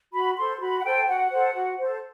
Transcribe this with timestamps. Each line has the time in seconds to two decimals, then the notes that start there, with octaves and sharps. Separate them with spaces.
0.13 F#4 B5
0.37 A4 C5 C6
0.60 F#4 B5
0.79 F#5
0.84 A4 C5 G5
1.08 F#4 F#5
1.31 A4 C5
1.55 F#4
1.78 A4 C5